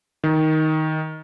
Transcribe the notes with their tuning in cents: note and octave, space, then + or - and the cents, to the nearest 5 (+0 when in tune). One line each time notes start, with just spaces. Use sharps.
D#3 +10